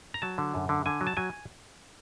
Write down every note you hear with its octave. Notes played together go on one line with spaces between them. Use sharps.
A#5
F#3 A5
D3
F#2
D3
D3 G#5
F#3
A5
F#3 G#5